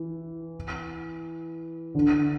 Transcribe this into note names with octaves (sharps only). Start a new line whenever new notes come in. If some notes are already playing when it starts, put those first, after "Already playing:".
Already playing: E3
D3